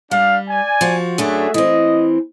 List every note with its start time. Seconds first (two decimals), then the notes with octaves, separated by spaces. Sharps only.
0.11 G3 D4 F5
0.49 D5 G#5
0.81 F3 F#4
1.18 F#2 A3 D4 F#4 G#4 E5
1.54 E3 C4 D#5